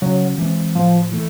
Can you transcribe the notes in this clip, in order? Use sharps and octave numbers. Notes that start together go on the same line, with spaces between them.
C#3 F#3
E3 G#3 C4
A2 F3
E3 A3